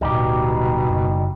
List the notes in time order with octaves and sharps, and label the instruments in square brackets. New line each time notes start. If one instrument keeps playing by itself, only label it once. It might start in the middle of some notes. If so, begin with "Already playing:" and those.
[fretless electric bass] D1 [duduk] B2 [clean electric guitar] G3 D#4 G4
[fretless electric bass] F#1